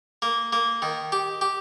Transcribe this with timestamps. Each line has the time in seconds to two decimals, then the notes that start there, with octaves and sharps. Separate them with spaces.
0.22 A#3
0.53 A#3
0.82 D#3
1.12 G4
1.41 G4